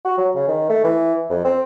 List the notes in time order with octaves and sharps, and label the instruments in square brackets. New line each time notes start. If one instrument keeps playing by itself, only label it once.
[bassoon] F#4
F#3
C#3
D#3
A3
E3
F2
C4